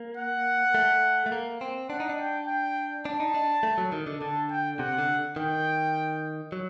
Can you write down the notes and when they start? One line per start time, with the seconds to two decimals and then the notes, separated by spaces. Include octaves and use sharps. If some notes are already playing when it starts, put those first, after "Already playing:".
Already playing: A#3
0.17 F#5
0.75 A3
1.26 A3
1.32 A#3
1.61 C4
1.90 D4 F#5
2.00 D#4
2.09 D4
2.19 G5
2.47 G5
3.05 D4 A5
3.20 D#4
3.34 D4
3.63 A3
3.78 F#3
3.92 D#3
4.07 D3
4.21 D3 A5
4.50 G5
4.79 C3 F#5
4.98 D3
5.36 D#3 G5
6.52 F#3